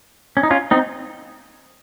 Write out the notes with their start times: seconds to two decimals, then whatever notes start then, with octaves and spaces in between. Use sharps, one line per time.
0.37 C#4
0.43 D#4
0.51 C#4 F4
0.71 C4 D#4